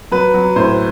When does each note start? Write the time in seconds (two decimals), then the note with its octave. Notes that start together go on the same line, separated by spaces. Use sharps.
0.11 F#3 B4
0.34 F#3
0.56 A2 C5